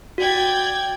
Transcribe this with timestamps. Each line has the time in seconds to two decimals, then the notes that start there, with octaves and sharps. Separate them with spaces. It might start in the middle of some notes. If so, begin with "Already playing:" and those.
0.18 F#4 D5 G5 G#6